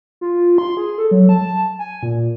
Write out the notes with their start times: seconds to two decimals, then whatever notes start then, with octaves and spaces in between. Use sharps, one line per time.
0.21 F4
0.58 C6
0.77 G#4
0.98 A4
1.11 F#3
1.29 A5
1.79 G#5
2.03 A#2